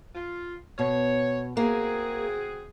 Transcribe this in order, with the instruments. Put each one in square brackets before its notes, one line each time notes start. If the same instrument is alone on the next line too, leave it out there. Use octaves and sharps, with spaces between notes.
[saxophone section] F4
[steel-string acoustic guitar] B2 [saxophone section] C#5
[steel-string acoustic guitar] A#3 [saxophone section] C4 F#4 G#4